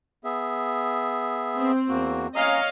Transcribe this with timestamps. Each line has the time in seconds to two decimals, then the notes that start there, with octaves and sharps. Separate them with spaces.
0.24 B3 G#4 E5
1.57 C4
1.89 E2 A#3 F#4
2.36 C#4 C#5 D#5 F5 A#5